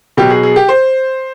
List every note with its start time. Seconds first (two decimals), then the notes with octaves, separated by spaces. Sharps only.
0.17 B2 F#3 G4
0.30 G#4
0.43 G#4
0.56 G4
0.69 C5